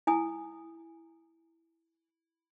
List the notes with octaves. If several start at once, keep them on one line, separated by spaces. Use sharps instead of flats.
E4 G#5 D#6